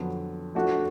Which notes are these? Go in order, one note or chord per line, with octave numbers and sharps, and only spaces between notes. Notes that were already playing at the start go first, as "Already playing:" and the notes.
Already playing: F2 D3 F#3 B3
F3 A3 D4 F#4